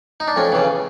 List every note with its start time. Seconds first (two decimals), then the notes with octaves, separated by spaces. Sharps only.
0.20 D#4
0.28 D4
0.36 F2 C#4
0.52 C#3 E3